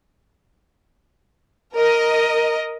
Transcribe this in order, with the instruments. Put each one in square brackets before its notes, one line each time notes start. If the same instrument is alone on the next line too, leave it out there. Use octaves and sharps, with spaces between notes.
[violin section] A#4 D#5